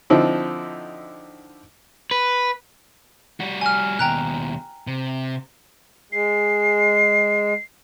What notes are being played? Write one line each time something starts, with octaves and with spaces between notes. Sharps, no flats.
D3 F3 C4 D#4 E4
B4
G3 F#4
G#5 F6
D#2 B2 G5 A#5 F#6
C3
G#3 C7